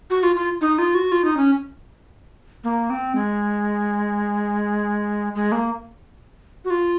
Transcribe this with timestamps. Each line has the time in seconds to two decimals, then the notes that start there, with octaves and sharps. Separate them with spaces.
0.10 F#4
0.23 F4
0.36 F4
0.61 D#4
0.78 F4
0.95 F#4
1.12 F4
1.25 D#4
1.37 C#4
2.64 A#3
2.90 C4
3.15 G#3
5.35 G#3
5.52 A#3
6.65 F#4
6.70 F4